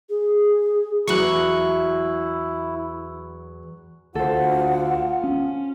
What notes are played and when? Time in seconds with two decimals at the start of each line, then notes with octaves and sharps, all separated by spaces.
0.09 G#4
1.08 E2 F#3 E4 C#6 F#6
4.15 D2 F4 A4 C5 F#5
5.24 C#4